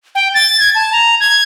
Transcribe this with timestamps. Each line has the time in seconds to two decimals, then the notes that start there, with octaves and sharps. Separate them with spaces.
0.15 G5
0.34 A6
0.60 G#6
0.75 A5
0.93 A#5
1.20 G#6